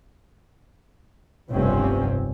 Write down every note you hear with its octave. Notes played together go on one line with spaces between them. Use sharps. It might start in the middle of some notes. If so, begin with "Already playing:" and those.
F1 B1 G2 C3 C4 C#4